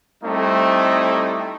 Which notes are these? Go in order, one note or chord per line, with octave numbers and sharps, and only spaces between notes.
G3 A3 C4 D#4 E4